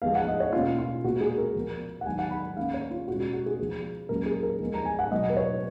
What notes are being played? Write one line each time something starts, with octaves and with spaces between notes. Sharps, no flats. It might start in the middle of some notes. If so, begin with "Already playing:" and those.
F3 G#3 B3 F5
F#5
D#5
C#5
B2 A#3 C#4 F4
F4
A#2 G#3 B3 F#4
G#4
A#4
F3 B3
F#5
D#3 F#3 B3 G#5
F#5
B5
D#3 A#3 C#4 F5
C#5
F4
B2 G#3 C#4 F#4
F#4
F#4
G#4
F3 B3
A#2 F#3 A#3 C#4 A#4
G#4
A#4
F3 G#3 B3
A#5
G#5
F#5
B2 F#3 B3 D#5
B4
C#5